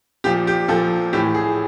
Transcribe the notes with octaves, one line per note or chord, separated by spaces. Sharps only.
A#2 F3 G4
G4
A#2 F3 A4
A2 E3 G4
G#4